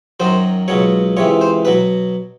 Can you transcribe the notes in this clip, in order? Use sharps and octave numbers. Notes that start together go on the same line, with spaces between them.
F#2 D#3 F#3 C5
C#2 B2 F#3 C#5
C#2 C3 E3 C#5
C5
B2 F#3 B4